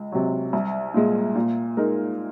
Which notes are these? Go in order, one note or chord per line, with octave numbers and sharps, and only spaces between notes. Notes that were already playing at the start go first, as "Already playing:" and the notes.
Already playing: C#2
C3 F#3
C2
A#2 G#3
A#2
G#3 D#4 A#4